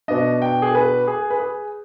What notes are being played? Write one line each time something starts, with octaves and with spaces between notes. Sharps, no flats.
B2 B3 D4 D#5
G5
G#4
B4
G#4
B4
G#4